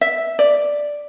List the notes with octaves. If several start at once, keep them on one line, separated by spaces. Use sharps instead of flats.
E5
D5